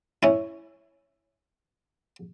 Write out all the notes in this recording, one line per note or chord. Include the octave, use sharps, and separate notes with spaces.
C#4 E4